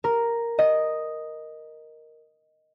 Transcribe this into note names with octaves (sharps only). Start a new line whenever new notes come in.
A#4
D#5